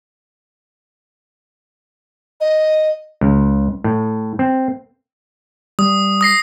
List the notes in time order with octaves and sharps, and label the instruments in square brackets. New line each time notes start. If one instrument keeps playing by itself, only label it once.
[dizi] D#5
[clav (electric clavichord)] C#2
A2
C4
[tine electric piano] G3 [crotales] D#6
[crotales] D#6 A#6 C7